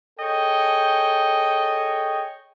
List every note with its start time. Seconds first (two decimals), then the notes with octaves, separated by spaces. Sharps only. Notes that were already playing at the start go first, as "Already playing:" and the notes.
0.20 G#4 A4 C#5 D#5 G5